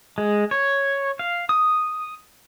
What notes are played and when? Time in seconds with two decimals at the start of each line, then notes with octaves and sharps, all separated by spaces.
0.18 G#3
0.51 C#5
1.19 F5
1.49 D#6